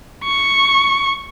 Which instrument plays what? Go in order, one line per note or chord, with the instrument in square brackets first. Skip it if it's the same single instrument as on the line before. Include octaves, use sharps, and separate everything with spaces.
[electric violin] C#6